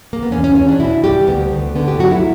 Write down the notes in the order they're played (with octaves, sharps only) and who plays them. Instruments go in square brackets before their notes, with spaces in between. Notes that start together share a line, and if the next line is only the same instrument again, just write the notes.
[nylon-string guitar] A#3
B3
E2 C#4
C#4
E2 C#4
D4
B2 E4
G3 G4
D2 B3
D2
D3 B3
G4
F#3 F#4
E4